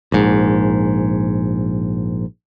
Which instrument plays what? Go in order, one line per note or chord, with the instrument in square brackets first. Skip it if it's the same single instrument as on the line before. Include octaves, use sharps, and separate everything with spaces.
[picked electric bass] A#1 G#2